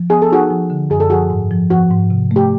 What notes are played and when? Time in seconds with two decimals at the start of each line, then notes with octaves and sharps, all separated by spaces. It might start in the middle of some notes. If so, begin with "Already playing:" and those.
Already playing: F3
0.10 B3 G#4
0.22 A4
0.30 D#4 F#4 G#4
0.50 F3
0.70 D3
0.90 F#2 G#4
1.00 A4
1.10 F3 F#4 G#4
1.30 G#2
1.51 F3
1.70 F3 F#4
1.91 G#2
2.10 C3
2.31 A3 G4